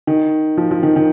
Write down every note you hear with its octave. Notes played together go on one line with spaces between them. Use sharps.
D#3
F3
F3
D#3
D#3